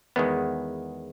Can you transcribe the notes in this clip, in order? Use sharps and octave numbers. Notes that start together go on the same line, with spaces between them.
E2 D#3 G#3 B3